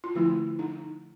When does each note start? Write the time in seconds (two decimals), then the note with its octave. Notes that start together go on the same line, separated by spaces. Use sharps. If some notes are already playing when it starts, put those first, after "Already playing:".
0.04 F4
0.15 D3 F3 A3 C4 E4
0.59 D#4